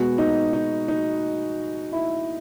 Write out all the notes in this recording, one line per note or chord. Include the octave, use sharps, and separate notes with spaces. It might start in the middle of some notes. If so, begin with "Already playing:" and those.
Already playing: B2 G#3 B3 F#4
D#4
D#4
D#4
E4